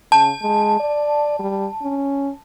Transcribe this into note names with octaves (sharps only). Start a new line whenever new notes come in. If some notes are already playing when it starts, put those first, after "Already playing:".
C#3 A5
G#3
D5
G3
C#4